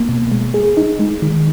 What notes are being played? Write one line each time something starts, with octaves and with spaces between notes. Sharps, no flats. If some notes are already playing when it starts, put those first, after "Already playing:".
Already playing: A#3
B2
G#3
G#4
D#4
G#3
D#3